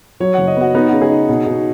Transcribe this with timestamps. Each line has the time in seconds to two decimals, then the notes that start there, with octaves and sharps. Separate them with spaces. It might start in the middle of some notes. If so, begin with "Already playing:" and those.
0.20 F#3 C#5
0.34 F#1 F#5
0.47 D#5
0.57 B3 F#4
0.75 B3 D#4
0.88 C#3 F#4
1.01 G#4
1.10 D#4
1.29 B2
1.46 B2